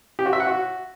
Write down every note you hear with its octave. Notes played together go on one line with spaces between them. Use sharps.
G4
F#4
E5
F#5
F#4